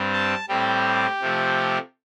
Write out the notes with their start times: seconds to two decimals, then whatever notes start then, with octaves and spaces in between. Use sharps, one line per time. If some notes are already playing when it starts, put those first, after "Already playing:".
Already playing: G2 G3 C4
0.13 A5
0.49 A2 G3 C4 G4
1.21 C3 F3 A3